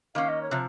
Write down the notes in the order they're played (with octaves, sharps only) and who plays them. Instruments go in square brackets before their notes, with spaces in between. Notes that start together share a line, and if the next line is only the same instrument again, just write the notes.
[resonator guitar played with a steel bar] D#3 A#3 C#4 [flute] F5
[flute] D#5
C#5
[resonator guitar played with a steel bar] C3 F3